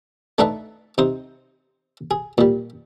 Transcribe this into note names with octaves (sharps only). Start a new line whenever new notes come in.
A3 D4 D#4 B4 E5 A5
C3 D#4 C5
G#4
A#2 G3